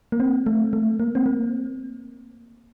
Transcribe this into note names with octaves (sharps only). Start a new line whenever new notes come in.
A#3
C4
A3
A3
A#3
C4
A#3